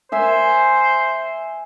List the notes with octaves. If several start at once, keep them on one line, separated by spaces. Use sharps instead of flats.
C5 E5 G#5